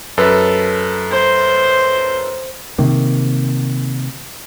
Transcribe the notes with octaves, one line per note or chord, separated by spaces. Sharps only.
F#2 A4 B4
C5
C3 D#3 A#3